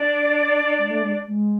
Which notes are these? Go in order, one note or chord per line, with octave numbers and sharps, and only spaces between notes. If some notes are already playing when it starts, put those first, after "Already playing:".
Already playing: D4 D5
G#3
A3
G#3
G#3